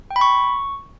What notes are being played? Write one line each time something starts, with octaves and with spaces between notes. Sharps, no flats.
G5
B5
C#6